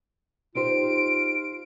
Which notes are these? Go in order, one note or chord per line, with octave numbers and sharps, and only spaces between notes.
D#4 F4 G4 C5 D7